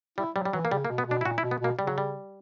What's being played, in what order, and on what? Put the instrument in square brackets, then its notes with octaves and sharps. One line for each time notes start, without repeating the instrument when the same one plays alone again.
[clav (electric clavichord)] G3 [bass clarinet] E4
[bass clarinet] F#3 [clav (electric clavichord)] G3
[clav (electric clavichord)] G3
[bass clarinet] E3 [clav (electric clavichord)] F#3
[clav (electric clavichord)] A#3
[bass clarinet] C#3 [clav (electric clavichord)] G3
[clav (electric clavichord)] A#3
[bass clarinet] B2
[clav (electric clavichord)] B3
[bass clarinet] B2 [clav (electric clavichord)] D4
[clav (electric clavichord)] E4
[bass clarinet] A#2 [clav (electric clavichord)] F#4
[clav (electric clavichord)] E4
[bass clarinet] B2
[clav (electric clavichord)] B3
[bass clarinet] B2 [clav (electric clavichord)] A#3
[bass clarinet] C#3 [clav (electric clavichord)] G3
[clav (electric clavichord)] F#3
G3